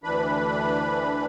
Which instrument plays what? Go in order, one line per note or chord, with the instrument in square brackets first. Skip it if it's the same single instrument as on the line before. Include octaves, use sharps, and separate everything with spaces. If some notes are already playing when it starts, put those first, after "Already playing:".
[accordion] D2 E3 D4 B4 B5